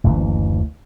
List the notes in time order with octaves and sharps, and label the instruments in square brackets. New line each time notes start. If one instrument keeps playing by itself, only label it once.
[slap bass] F#1 D2 C#3 E3